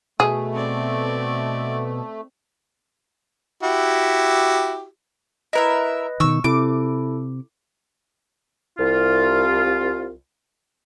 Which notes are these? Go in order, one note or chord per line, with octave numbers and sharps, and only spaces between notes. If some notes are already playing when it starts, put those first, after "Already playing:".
B2 A3 G#4
C4 D5
E4 F#4 G4
E4 A#4 B4 D#5 E5
B2 D#3 C#6 E6
C3 E4 A4 D6
C2 F4